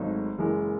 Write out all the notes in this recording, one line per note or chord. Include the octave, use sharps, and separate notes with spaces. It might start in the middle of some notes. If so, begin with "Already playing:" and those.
Already playing: G#1 G#2 F#3 A3 D#4
F#1 F#2 E3 G#3